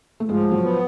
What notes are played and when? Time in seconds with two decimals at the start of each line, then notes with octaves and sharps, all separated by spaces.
0.20 A3
0.29 G#2 F3 G#3
0.52 F#3
0.62 B3